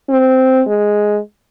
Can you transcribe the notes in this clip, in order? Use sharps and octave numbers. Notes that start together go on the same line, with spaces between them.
C4
G#3